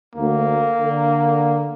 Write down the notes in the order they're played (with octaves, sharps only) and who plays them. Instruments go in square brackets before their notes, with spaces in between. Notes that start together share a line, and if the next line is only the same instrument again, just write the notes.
[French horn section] D2 [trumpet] A#3
[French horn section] D3